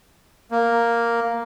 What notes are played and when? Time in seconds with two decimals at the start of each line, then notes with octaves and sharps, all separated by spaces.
0.51 A#3